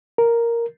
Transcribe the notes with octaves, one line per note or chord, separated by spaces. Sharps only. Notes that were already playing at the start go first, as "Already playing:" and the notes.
A#4